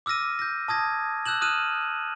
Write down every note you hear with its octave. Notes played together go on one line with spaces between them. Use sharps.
D6 E6 F6 A#6 D#7
G6 A#6
A5 D#6 G#6 A#6
E6 F#6 G6 E7 F#7
D#6 F6 F#6 D#7 E7